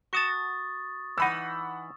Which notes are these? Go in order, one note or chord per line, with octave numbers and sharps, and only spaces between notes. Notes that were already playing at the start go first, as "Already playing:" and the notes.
F#4 A5 C#6 D#6 A6
E3 D#4 F#5 B5 E6